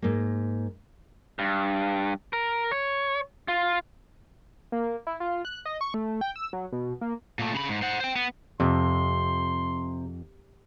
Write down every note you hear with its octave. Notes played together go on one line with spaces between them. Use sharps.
G#2 A#3
G2
A#4
C#5
F4
A#3
E4
F4
F#6
D#5
C#6
A3
G5
E6
F#3
B2
A#3
A#2 A3
C#3 B5
G#2
C5 F#5
C5 G5
B3
F2 C3 C6